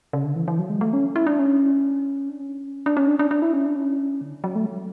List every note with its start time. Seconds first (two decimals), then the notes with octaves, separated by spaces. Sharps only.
0.13 C#3
0.24 D3
0.36 E3
0.48 E3
0.59 F#3
0.70 G#3
0.81 A3
0.93 C#4
1.16 E4
1.27 D4
1.39 C#4
2.29 D4
2.40 C#4
2.86 D4
2.97 C#4
3.08 D4
3.19 D4
3.31 D4
3.42 E4
3.53 C#4
3.65 D4
3.76 C#4
4.21 D3
4.44 F#3
4.55 A3
4.66 F#3